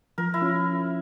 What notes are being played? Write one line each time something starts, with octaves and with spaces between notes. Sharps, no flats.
F3 A#4
E4
C#4 F4